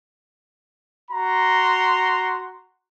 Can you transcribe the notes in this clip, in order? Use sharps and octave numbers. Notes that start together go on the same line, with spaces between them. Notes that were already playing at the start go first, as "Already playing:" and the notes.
F#4 A#5 C6